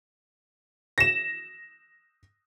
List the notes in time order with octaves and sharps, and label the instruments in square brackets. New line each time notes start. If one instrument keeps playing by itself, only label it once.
[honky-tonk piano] A#6 E7